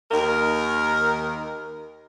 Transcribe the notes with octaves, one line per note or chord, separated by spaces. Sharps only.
D#2 D#3 A#4